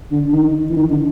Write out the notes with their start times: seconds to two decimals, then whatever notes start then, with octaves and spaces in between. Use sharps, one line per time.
0.11 D3
0.33 D#3
0.70 E3
0.76 D#3
0.91 D3